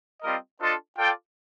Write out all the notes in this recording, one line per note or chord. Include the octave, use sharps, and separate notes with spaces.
G3 C4 F4 A#4 D#5
D4 F4 A4 C5 D#5
F4 A4 D5 G5